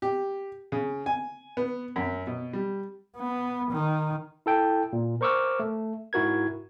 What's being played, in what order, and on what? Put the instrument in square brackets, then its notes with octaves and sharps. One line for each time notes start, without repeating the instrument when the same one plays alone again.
[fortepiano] G4
C#3
G#5
B3
F#2
B2
G3
[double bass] B3
D#3
[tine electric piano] E4 A4 G5
A#2
A#4 C5 C#6 D6 E6 F6
A3
G#2 E4 F#4 A#4 G#6